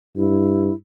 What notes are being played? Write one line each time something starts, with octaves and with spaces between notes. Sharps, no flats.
G2 E4